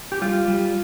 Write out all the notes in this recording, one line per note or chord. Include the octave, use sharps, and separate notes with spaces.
G4
G3 F4
G3